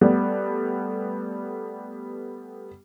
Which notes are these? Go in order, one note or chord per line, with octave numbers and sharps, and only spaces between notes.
G3 A3 B3